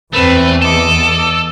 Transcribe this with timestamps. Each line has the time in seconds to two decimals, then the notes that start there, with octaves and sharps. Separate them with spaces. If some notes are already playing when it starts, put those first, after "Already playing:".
0.13 E2 A3 C4 B4
0.62 A4 D#5 D6